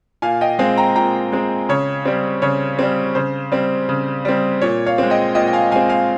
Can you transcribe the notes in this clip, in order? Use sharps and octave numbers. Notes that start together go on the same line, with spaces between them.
A#2 F5 G#5
D#5 G5
G#3 C4 F5 G#5
G5 A#5
A#2 G5 A#5
G#3 C4
C#3 C#5
G3 C4
C#3 C#5
G3 C4
C#3 C5
G3 C4
C#3
G3 C4
A#2 C#5
C#5 F5
G#3 C4
D#5 G5
A#2 D#5 G5
G5
F5 G#5
G#3 C4 F5 G#5
F5 G#5